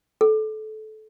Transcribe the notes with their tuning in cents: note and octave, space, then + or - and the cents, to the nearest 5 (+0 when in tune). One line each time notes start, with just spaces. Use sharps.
A4 -20